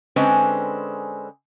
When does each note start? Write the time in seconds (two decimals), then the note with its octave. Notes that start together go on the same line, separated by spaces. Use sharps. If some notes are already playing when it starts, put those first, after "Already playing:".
0.16 D3 G#3 C4 C#4 B4